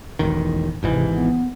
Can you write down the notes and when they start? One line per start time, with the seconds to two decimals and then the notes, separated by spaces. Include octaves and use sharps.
0.19 E1 A1 D#3
0.83 G#1 G#2 C3 E3
1.14 B3